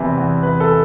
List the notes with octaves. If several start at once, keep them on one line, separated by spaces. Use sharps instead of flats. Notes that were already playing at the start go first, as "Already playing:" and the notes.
Already playing: E2 C3 E3 B4
E2
E2 B4
A4
E3